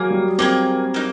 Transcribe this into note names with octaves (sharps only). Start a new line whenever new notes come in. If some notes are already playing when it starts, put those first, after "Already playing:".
Already playing: F#3 A#3 G#4
G3
A#3 C4 D#4 G#4
A#3 D#4